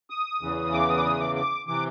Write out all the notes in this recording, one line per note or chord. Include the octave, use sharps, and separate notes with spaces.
D#6
E2 C#3 E3
D6
D#6
D6
D#6
D6
D6
C3 E3 D6